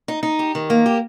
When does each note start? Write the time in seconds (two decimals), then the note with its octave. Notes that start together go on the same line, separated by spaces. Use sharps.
0.08 D#4
0.23 D#4
0.39 G4
0.55 D#3
0.70 A#3
0.86 G4